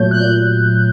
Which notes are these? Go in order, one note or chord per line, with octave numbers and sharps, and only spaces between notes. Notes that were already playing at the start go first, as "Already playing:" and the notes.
Already playing: A#2 F#3 A3 G6
F#6
A#2 G6